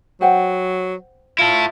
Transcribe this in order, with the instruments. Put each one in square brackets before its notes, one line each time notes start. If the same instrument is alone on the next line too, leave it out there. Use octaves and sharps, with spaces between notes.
[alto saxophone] F#3 [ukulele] C5 F#5 G5
[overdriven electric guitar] E4 A4 [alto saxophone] F4